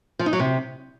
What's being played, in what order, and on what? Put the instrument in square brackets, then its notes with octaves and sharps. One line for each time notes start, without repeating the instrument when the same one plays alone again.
[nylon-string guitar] F3
D#4
F#3
C3